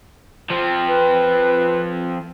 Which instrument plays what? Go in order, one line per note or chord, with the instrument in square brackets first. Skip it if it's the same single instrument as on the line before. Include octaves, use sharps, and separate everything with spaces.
[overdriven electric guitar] F3 C4
[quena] B4